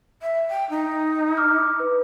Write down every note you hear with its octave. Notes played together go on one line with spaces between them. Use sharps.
E5
G5
D#4
D6 D#6 F6
B4